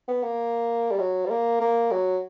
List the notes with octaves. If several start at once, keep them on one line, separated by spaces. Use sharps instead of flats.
B3
A#3
G3
F#3
G3
A#3
A#3
F#3